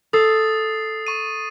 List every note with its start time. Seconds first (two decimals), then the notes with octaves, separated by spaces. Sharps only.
0.13 A4 D#6 A6 C7
1.07 C#6 D#7